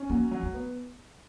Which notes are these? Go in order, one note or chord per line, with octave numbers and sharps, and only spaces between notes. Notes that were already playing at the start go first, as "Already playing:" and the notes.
Already playing: C#4
F#3 A#3
F#3
A3
B3